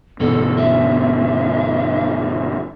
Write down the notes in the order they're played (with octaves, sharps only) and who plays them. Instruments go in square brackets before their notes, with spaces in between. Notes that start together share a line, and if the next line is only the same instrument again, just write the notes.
[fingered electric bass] G1 E2 B2 [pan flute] A4
[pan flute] E5